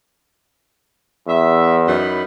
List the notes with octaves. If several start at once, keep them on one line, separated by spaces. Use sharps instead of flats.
E2 E5
F#2 D#4 B5